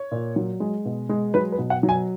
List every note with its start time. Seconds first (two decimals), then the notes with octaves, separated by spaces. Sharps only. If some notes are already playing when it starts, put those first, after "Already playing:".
Already playing: C#5
0.11 A#2
0.36 F#3
0.60 G#3
0.85 B2
1.09 G#3
1.34 F#3 B4
1.52 B4
1.58 B2
1.70 F#5
1.83 F#3
1.89 G#5